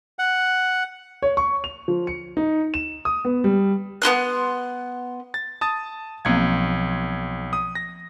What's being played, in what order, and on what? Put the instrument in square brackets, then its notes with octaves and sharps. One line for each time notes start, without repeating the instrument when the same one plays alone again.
[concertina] F#5
[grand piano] C#5
C#6
F7
F3
C#7
D#4
E7
D#6
B3
G3
[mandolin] B3 G#4 C6 F#6
[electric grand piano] A6
A5 D#6 A6
[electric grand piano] B1 G#6 [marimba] F3 A#3 C4
[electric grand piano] D#6
A#6